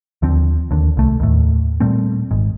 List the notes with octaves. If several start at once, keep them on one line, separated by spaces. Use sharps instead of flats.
D#2 D3 F3 C4
D#2 D3
C2 A3
D#2 A2
A#2 G3 A3 C4
G#1 G#2